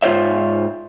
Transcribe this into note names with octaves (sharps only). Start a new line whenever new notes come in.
G#2 F4 C5 C#5 E5